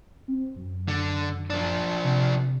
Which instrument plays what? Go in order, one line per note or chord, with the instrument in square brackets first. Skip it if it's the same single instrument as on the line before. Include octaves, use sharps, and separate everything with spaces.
[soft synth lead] C4
F#2
[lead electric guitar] D3
F3 D4
[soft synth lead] C3